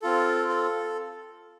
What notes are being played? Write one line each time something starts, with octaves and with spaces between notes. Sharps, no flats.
C4 F4 A4
A4